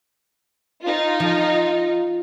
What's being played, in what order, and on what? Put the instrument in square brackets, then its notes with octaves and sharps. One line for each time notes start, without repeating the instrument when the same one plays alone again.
[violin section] D#4 F4
[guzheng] F3